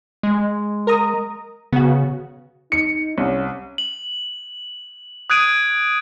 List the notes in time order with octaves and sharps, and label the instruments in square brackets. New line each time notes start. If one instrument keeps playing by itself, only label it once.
[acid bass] G#3
[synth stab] A#4 A#5 D#6
[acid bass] C#3 [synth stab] B3 F#4
[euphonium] D#4 [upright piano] C#7
[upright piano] C2 [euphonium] C#4
[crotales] F#7
D#6 F#6 G#6 D7 D#7